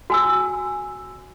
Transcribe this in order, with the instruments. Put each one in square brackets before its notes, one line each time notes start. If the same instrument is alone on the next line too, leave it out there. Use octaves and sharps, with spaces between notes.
[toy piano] F#4 G#5 E6